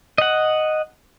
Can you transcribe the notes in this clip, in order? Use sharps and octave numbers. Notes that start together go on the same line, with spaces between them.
D#5 F#5